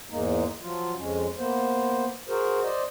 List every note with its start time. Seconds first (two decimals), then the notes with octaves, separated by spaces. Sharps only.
0.10 E2 G#2 G#3 A#3 D#4
0.61 F3 F#3 F4
0.96 F2 G#3 C#4
1.37 A#3 B3 C5
2.28 F#4 G#4 A#4 C5
2.63 C5 D5 D#5